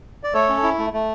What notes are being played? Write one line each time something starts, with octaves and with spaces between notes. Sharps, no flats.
D5
A3 A4 C#5
C#4
E4
A3
A3